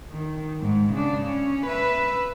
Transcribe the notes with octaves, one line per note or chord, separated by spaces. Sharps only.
D#3
G#2
C#3 D4
C#4
B4 E5